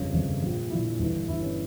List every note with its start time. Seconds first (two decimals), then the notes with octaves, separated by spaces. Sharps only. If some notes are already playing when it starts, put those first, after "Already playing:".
Already playing: G1 F2 C#3 C#4
0.13 G1 F2 C#3
0.42 A#1 A#2
0.70 A#1 A#2 E4
0.99 G1 G2 E3
1.28 G1 G2 E3 E4
1.42 C#4